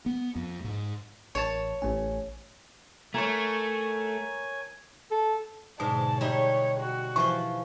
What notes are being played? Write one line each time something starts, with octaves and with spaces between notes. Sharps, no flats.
B3
F2
G#2
A1 C#5 A5
A1 A3 C#4 G#5
A3 A#4 C#5 G#5
A4
G#2 B2 D3 A5
G3 D#4 C#5 E5
F#4
E3 F3 F4 C#6